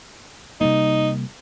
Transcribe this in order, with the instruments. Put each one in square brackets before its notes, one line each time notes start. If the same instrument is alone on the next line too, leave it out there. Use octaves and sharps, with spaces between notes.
[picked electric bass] C3 G3 A#3 [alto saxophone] D#4